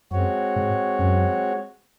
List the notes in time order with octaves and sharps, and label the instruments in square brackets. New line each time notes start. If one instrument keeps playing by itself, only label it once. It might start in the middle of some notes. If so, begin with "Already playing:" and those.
[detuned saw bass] F#2 [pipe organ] G#3 C4 F#4 C#5
[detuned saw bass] G#2
F#2